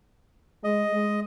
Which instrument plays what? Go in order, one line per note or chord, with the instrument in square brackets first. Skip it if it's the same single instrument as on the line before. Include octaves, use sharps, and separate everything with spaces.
[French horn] G#3 [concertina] D#5
[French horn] G#3